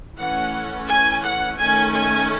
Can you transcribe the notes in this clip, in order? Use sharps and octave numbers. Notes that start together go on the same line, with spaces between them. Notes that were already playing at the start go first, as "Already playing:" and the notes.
E3 A3 C#4 F#5
G#5
F#5
D#3 A3 C#4 G#5
G#5